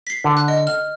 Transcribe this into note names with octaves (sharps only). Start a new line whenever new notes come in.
B6 C7
D3
F#6
D#5
F6